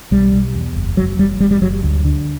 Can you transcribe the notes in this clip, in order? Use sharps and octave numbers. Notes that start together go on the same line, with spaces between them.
B1 G3
B1
E2
F#1
F#1 F#3
F#1 G3
F#1 G3
G3
F#1 F#3
D2
D3